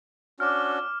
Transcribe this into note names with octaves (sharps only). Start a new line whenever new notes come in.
C#4 D4 F#4 D6 F6